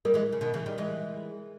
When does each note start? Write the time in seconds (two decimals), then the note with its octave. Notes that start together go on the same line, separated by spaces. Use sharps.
0.05 G3 A#3 A#4
0.14 E3 G#3
0.32 C#3
0.41 B2 D#3
0.54 C#3 E3
0.66 D#3 G3
0.78 E3 G#3